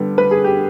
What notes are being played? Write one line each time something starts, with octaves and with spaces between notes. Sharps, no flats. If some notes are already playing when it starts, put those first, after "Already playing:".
Already playing: D3 G3 B3
B4
G#4
G4